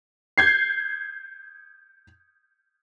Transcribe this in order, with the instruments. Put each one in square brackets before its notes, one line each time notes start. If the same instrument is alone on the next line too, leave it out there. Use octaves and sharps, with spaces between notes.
[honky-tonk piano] G6 G#6 C7